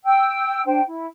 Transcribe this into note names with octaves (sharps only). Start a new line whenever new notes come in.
G5 E6
D4 C5 G5
E4